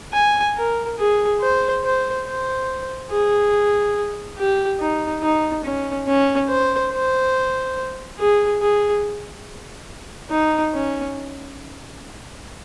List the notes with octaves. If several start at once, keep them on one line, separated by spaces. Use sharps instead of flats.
G#5
A#4
G#4
C5
C5
C5
G#4
G4
D#4
D#4
C#4
C#4
C5
C5
G#4
G#4
D#4
C#4